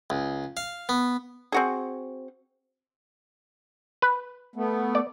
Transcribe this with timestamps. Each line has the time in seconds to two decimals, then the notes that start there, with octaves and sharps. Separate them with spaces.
0.10 C#2
0.57 F5
0.89 B3
1.52 C4 F#4 G#4
4.02 B4
4.56 A3 B3
4.95 D5